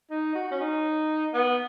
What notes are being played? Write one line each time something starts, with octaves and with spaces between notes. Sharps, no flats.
D#4
F#4
C#4
D#4
B3